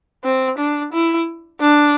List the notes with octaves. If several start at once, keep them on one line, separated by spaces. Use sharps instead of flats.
C4
D4
E4
D4